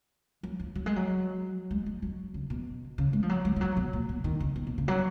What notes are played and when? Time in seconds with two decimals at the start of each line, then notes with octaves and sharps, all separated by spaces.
0.43 F#3
0.59 F3
0.75 F#3
0.86 G#3
0.96 F#3
1.71 G#3
1.86 G#3
2.02 F#3
2.34 C#3
2.50 B2
2.98 C#3
3.13 G#3
3.22 F3
3.29 F#3
3.45 G#3
3.56 F3
3.61 F#3
3.77 B2
3.93 A#2
4.09 B2
4.24 D#3
4.40 C#3
4.56 B2
4.67 B2
4.78 C#3
4.88 F#3